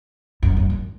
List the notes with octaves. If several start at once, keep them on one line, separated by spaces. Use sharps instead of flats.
F#2
F#2
F#2